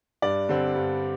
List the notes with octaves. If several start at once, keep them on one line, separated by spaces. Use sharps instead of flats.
G2 D5
D3 G3 C4
G2